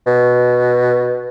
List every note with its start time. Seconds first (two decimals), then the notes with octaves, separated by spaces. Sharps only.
0.07 B2